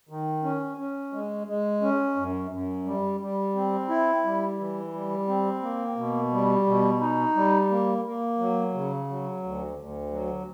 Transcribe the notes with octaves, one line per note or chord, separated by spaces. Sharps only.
D#3
C#4
C#4
G#3
G#3
C#4
F#2
F#2
G3
G3
C4
E4
G3
E3
G3
C4
A#3
B2
G3
B2
D#4
G3
A#3
A#3
F#3
C#3
F#3
D2
D2
F#3